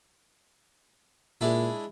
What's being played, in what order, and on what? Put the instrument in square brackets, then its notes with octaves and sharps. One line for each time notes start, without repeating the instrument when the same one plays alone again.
[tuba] A#2 [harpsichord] G#3 D4 E4